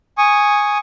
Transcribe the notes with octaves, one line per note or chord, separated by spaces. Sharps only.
G#5 C#6 D#6